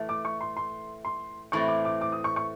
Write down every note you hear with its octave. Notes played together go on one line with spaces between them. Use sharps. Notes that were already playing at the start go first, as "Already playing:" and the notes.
Already playing: A2 E3 A3
D6
C#6
C6
C6
C6
A2 E3 A3 C4 C#6
D6
D6
D6
D#6
C#6
C#6